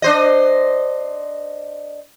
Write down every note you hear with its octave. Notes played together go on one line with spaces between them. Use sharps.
D4 C5 D#5